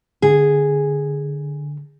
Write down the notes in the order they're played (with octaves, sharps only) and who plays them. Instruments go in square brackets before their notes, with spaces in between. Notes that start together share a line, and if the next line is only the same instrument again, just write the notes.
[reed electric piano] D3 [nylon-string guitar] G#4